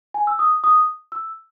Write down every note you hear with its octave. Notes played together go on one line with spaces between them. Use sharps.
G#5
E6
D#6
D#6
E6